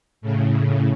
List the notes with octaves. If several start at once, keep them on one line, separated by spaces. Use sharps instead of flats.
A2 C#3